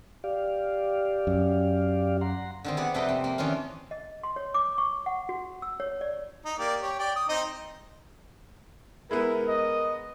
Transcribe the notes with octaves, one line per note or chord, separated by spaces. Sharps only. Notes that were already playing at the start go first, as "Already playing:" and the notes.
G4 D5 F5
F#2
F#5 A#5 C6
D3 D#3 C4
B3 G#4 D5 F#5
F2 C3 A4 B4 D#5 G5
C4
A#3
D#3 E3 C#4 D4 F4
D#5
C6
C#5
D6
C#6
F#5
F#4
E6
C#5
D5
D#4
A#3 G4 D5
G4 C#5
D5 G5
D#6
C4 D#4 D#5
G#3 B3 E4 A#4
D#5